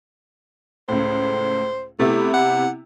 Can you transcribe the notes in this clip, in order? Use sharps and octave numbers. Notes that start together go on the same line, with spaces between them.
C#2 A2 C5
C3 A3 B3 E4
F#5